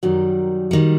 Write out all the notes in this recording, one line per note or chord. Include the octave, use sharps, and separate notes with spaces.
F#2 D#3 F#3 G3
D#3 G3